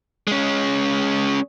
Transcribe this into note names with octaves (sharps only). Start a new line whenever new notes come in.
G#3 C#4